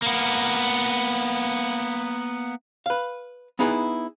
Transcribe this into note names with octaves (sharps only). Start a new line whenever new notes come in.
A#3 B3
B4 F5
B3 D#4 E4 G#4 B4